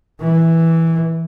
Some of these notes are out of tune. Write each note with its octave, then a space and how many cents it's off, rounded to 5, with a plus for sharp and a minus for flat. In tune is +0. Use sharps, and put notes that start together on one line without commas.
E3 -5